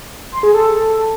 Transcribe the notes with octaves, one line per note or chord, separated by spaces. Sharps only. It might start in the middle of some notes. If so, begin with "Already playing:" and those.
C6
G#4
A4